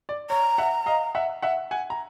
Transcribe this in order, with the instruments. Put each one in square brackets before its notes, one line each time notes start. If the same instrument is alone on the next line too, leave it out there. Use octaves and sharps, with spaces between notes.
[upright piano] D5
[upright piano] C#5 [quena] A#5
[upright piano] E5 F#5
D#5 F5
E5 F#5
E5 F#5
F#5 G#5
A#5